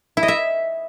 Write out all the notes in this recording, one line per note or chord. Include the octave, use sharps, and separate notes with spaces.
E4
D#5
E5